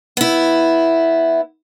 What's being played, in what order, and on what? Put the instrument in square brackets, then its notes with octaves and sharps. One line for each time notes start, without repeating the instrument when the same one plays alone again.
[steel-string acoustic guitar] B3 E4